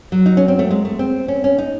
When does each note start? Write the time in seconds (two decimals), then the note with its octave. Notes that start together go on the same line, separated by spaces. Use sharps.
0.12 F#3
0.26 D#4
0.37 C#4
0.48 C4
0.59 A3
0.71 G#3
0.85 A3
0.99 C4
1.28 C#4
1.44 C#4
1.58 D#4